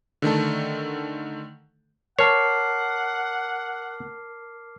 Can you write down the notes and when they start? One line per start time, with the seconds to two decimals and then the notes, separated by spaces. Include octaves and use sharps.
0.22 D3 D#3 A3 A4
2.19 A#4 C#5 F#5 A5 D6 F6 C7